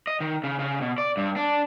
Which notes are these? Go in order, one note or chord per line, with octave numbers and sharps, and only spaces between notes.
D#5
D#3
C#3
C#3
B2
D5
G2
D4